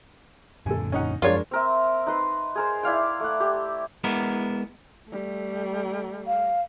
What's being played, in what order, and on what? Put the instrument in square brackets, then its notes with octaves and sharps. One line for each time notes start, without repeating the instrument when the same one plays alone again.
[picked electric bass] F#2 A#2 D3 [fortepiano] A4 G#5
[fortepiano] C#4 D#4 F#5
[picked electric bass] F#2 F3 F#3 [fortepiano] G#3 D4 A#4 [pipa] F4 C#5
[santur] C4 A#4 E5
D#4 B4 C6
G#4 A#4 C5
E4 D5 F5 G5
A3 F#5
G4
[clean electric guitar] G#3 B3 E4 A#4
[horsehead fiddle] G3 A3
[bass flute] F5